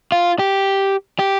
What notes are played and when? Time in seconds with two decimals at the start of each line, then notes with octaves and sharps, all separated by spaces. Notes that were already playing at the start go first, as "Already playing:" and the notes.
0.12 F4
0.39 G4
1.19 G4